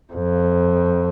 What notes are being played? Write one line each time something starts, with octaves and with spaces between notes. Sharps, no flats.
F2